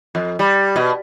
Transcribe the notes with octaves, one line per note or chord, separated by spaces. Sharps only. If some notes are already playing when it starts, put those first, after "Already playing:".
F2
G3
B2